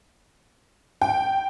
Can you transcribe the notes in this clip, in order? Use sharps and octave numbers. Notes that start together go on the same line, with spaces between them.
G5